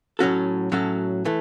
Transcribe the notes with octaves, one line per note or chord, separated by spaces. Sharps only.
A2 F#3 C#4 F#4 A4
A2 F#3 C#4 F#4 A4
E3 A3